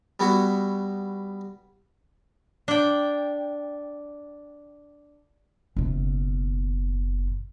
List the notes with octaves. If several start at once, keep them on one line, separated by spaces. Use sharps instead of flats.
G3 B3 E4 F#4
D4 G5
F#1 B2